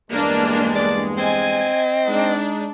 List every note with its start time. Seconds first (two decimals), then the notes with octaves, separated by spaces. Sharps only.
0.11 E2 G2 G#3 A#3 D4
0.75 D5
1.18 C4 D#5 G#5
2.07 G#3 D4 D#4